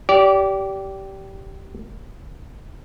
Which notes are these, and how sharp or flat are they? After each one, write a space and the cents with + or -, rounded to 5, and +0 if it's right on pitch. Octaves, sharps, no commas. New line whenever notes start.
G4 -15 D5 -30